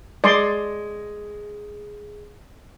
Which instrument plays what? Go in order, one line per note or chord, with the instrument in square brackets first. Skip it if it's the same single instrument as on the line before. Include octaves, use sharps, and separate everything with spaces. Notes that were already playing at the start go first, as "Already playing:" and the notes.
[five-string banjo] G#3 [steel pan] D5 C6